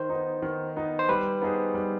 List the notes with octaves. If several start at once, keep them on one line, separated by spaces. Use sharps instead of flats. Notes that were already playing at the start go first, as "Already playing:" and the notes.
Already playing: D#3 C5
B3 D#4
D#3
B3 D#4
C5
G3 B4
B3 D#4 G#4 C5
G3